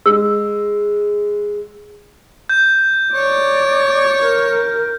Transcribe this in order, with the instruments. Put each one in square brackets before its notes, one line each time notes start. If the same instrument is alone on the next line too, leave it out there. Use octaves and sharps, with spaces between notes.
[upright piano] G#3 [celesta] E6
[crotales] G6
[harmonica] C#5 [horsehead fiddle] D5
[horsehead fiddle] A#4